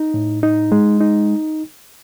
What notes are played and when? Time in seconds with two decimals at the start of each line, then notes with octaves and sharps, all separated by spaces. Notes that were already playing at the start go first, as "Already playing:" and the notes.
Already playing: D#4
0.14 A2
0.43 D#4
0.72 G#3
1.01 D#4